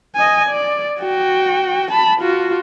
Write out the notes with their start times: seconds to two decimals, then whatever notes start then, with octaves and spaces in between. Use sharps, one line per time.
0.15 D#5 G#5
0.49 D5
0.99 F#4 G5
1.91 A5 B5
2.21 F4 F#4